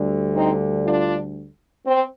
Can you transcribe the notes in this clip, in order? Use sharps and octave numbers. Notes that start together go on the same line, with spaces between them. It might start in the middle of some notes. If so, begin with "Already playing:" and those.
Already playing: D2 D3 G3
C4 D#4
D4 F4
C4